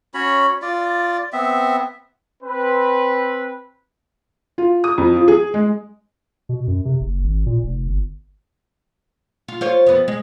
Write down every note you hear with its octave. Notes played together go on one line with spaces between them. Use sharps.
C#4 F#4 C#5 B5
F4 D5
B3 C4 E5
C4 B4
F4
D#6
F2
F3
G#4
G#3
B2
F#2
C3
F#1
G#1
A#2
F1
G1
F4
F4 C5 C#5
F2 B3
G#3